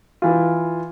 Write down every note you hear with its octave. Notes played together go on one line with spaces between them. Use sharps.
E3 F4